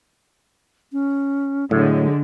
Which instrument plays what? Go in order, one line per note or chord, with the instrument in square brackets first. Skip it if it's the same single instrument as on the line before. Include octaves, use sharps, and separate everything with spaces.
[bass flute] C#4
[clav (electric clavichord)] A2 [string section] D3 G#3 [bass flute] F#3